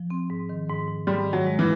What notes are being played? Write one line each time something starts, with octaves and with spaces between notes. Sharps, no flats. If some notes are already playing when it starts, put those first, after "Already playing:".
Already playing: F3
C4
G#2
D#3
G#2
G#2
G#2 G3
D#3
F#3
G#3
E3